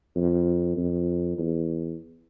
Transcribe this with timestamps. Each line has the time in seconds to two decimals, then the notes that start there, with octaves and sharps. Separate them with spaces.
0.16 F2
0.77 F2
1.38 E2